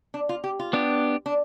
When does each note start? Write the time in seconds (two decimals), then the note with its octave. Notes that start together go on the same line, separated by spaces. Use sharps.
0.14 D4
0.29 F4
0.44 G4
0.59 F4
0.73 B3 D4 G4
1.26 D4